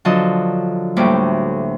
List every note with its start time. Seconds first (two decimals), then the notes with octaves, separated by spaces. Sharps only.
0.05 D3 F3 F#3 A4 D#5
0.96 D2 A2 G3 A#3 D6